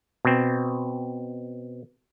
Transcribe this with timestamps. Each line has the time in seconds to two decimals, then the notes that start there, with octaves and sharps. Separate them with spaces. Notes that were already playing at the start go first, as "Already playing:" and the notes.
0.25 B2 C4